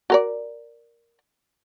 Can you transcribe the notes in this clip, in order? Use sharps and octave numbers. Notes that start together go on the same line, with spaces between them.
F#4 A#4 D5